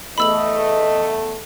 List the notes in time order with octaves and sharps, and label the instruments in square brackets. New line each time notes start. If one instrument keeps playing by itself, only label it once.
[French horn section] E2 A3 [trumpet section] D#5 [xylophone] B5 E6 F#7